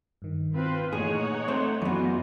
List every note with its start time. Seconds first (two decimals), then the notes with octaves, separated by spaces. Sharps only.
0.22 G2 D#3
0.54 C4 F4 B4
0.92 A#2 E3 A3 D#4 G#4 C#5 F#5
1.48 A3 C4 C5
1.82 F#2 E3 B3 F4 F#4 D#5